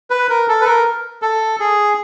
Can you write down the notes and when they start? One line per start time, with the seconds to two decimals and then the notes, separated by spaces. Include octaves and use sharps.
0.10 B4
0.29 A#4
0.48 A4
0.61 B4
0.66 A#4
1.22 A4
1.60 G#4